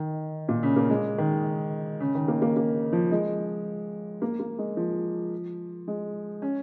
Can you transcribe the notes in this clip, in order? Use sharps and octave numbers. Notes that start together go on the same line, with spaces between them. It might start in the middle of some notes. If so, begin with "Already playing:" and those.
Already playing: D#3
A#2
C#3
A#3
G#3
D#3
C#3
D#3
A#3
A#3
A#3
F3
G#3
A#3
A#3
G#3
F3
G#3
C#4